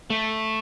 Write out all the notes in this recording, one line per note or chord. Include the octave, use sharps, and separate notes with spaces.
A3